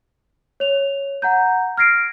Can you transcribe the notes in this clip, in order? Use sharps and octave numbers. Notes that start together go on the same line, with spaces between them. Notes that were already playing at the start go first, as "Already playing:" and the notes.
C#5 F7
F#5 A#5 G6
F6 G#6 A#6 C7 D7